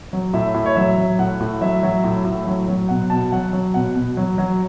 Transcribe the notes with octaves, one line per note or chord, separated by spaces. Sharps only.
F#3
A2 E5
A2
C#5
F#3 E5
F#3
A2 F#5
A2
F#3 E5
F#3
A2
A2
F#3
F#3
B2 F#5
B2 A5
F#3 F#5
F#3
B2 F#5
B2
F#3
F#3